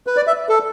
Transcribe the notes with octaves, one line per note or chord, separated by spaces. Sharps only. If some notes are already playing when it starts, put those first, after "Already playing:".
B4
D5
E5
A4